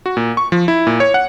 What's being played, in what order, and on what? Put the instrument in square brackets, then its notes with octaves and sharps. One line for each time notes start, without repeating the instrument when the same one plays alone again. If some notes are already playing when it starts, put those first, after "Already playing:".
[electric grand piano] F#4
A#2
C#6
F3
E4
A#2
C#5
F#5